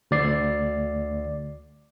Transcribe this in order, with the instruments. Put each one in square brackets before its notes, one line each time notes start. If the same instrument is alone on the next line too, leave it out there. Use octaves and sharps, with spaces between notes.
[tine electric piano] D2 D5 C7